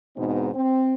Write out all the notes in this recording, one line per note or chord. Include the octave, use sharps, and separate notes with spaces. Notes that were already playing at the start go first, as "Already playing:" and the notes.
E2 G#2 B2 C4 D#4
C4